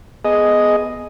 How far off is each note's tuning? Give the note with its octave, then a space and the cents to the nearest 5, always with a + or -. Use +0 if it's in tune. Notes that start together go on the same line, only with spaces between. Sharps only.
B3 +0 G#4 +10 D#5 +0